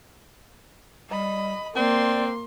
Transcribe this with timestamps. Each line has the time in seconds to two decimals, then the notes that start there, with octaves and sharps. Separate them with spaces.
1.10 G3 D#5 B5
1.76 A#3 C4 D5 C6